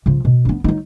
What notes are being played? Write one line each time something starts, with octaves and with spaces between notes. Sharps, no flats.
C#3 F3
B2
B3 D4
F#3 D#4